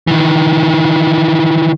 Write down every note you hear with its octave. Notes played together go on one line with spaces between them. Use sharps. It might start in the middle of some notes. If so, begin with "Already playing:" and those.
D#3 E3